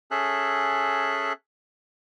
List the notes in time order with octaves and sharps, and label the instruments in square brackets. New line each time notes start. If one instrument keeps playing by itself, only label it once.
[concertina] C#4 G#4 A4 E5 F#6